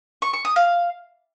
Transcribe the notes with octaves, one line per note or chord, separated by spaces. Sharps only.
C#6
C#6
D#6
F5